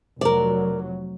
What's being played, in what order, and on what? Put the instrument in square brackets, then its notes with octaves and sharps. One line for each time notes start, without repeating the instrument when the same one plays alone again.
[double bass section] F1 F#3 [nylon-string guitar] A#4 D5